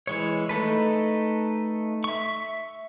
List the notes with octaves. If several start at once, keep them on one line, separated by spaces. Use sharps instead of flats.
E3 G#3 C#5
A3 D#4 A4 B4
E5 C#6